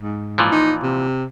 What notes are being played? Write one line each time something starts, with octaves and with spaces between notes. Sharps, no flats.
G#2
A#2 E3 F3
D#4
C3